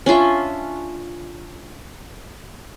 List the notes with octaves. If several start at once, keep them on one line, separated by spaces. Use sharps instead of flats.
C#4 D4 F4 E5